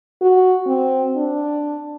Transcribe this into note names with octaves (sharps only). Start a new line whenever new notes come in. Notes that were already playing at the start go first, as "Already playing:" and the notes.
F#4
C4
D4